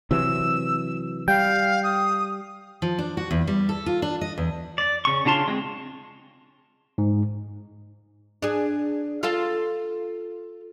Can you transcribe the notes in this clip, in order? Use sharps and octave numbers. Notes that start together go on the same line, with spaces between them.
C3 E3 F#3 E6
G3 F5 G5
D#6
F3
D4
F#4
E2
G3
A4
F4
D4
D#5
E2
D5
C#3 C#6
C#3 D4 F4 A5 C6
G#3 C4 G#4
G#2
D4 G#4
F4 A4 F5